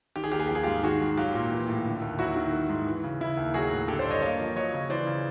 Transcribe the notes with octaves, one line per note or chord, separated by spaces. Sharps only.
D#3 G4
G#4
D#2 G4
G#4
F3 G4
G#4
G#2 F4 G4
D#3 F#4 G#4
G#2
F#3 F4 G4
A#2
E3
A2
D3
D#2
F#3 E4 F#4
D#3
D#3
G#2
E3
C#3
C#3 E4
D#2
F#3 F#4 G#4
A2
D3 G4 A4
C5 D5
G2
C#5 D#5
A#3 C#5 D#5
F3
F#3 C#5 D#5
C#3
E3 C5 D5
C#3